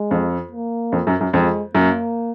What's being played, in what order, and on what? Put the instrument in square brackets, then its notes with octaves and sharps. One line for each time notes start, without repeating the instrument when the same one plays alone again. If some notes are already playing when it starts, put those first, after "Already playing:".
Already playing: [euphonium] G#3
[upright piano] F2
[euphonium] A#3
[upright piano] F2
F#2
F#2
[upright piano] F2 [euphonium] G#3
[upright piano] F#2 [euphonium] A#3